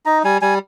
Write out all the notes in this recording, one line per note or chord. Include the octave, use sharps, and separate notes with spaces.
D#4 A#5
G3 G#5
G3 G#5